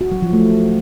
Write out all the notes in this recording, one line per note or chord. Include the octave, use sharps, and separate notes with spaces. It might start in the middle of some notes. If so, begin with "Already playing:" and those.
F#4
F#3
F3
A3